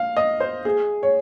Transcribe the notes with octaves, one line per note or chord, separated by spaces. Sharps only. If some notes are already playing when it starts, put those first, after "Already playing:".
Already playing: F5
D#5
C5
G#4
C#5